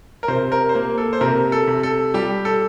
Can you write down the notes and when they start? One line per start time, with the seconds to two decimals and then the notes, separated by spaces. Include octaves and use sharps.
0.23 A#4
0.28 C3 C5
0.52 A#4
0.69 C5
0.74 A#3 A#4
0.98 A4
1.13 C5
1.21 C3 A#4
1.52 A4
1.68 C3
1.83 A4
2.14 G3 G4
2.45 A4